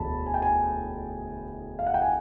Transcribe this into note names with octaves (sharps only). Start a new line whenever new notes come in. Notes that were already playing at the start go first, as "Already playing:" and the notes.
Already playing: E1 D2 A5 B5
G#5
G5
G#5
F5
F#5
G5
G#5